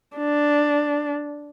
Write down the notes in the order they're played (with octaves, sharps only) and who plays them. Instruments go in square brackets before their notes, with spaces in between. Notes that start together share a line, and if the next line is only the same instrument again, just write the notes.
[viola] D4